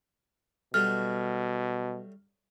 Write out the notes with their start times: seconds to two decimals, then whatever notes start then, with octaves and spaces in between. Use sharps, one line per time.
0.74 B2 F#3 G3 A3 F6